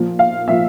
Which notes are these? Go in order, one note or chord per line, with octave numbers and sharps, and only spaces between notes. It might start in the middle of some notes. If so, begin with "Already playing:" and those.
Already playing: A#2 F3 A#3
F5
A#2 F3 A#3 E5